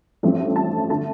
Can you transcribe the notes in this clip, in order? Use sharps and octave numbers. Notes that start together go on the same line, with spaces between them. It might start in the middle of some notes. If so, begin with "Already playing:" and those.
A1 G2 F3 A3 C4
A5
D3 A3 A5